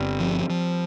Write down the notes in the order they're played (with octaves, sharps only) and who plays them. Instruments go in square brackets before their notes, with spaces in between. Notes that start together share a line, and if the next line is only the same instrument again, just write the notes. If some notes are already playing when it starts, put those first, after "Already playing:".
Already playing: [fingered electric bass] G1 [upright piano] G3 C4
[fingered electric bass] F3
F3